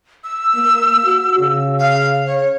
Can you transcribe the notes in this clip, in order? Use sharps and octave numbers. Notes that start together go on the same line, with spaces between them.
E6
A#3
F#4
C#3
F5
C#5